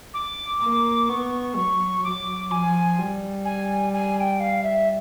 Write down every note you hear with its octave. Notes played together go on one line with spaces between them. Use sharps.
D6
A#3
B3 C#6
F#3 C#6
F#3 D6
F3 G#5
G3
G#5
G#5
G#5
G5
F5
E5